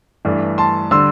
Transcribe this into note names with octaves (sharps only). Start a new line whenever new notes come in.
G2 E3 A3 D4
A5 C6
D3 G3 C6 E6